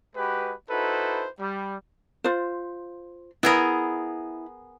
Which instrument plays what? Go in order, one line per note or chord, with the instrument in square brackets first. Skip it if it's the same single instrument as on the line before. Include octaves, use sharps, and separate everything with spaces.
[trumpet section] G#3 F#4 G4 B4
D#4 E4 F#4 A4 B4 C5
G3
[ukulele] F4 C5
[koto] B3 G#4 A#4 [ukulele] E4 B5